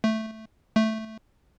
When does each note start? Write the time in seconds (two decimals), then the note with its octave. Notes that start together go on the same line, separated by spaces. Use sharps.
0.04 A3
0.76 A3